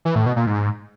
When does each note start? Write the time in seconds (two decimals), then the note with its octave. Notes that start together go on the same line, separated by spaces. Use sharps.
0.05 E3
0.16 A2
0.26 B2
0.36 A#2
0.47 G#2